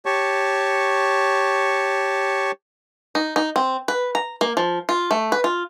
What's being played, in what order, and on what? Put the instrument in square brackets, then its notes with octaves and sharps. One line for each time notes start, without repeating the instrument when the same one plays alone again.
[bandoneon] G4 C#5 A5 C#6
[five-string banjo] D#4
D#4
C4
B4
A#5
A#3
F3
F4
A3
B4
F4